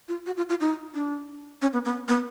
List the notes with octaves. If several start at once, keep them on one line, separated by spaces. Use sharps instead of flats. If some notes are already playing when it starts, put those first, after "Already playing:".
F4
F#4
F4
F4
D#4
D4
C#4
B3
B3
B3